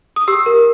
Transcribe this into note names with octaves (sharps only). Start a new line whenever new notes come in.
D#6
G4 E6
A#4